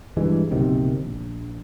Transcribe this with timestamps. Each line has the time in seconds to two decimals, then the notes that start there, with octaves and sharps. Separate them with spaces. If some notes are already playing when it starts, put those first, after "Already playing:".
0.17 G2 E3 G#3
0.51 F#1 B1 C3 D#3
1.03 A#1